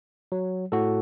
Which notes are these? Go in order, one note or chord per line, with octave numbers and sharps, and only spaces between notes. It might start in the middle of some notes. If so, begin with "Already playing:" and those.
F#3
A2 F#4 A4